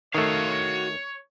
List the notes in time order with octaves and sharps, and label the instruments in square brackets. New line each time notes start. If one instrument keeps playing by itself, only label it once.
[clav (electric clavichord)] D#3 A3 [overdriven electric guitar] F#4 F5 [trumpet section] C#5